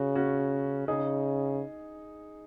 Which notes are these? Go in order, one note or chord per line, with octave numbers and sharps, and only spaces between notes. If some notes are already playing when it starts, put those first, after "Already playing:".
Already playing: C#3 F#4
C#4 F#4
C#3 D#4 G#4